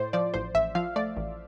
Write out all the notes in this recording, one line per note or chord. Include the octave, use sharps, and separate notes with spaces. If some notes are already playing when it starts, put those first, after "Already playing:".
Already playing: A2 C5 D5
F3 D5
A1 C5
A1 E5
F3 F5
A3 D5
A1